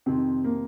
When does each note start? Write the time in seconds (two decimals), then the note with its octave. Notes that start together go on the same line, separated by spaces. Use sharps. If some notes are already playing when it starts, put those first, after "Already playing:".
0.06 F2 C3 D#3 C4
0.44 A#3